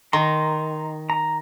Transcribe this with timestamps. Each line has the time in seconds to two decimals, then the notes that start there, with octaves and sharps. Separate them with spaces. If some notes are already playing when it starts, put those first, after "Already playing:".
0.13 D#3 A#5 C6
1.10 A#5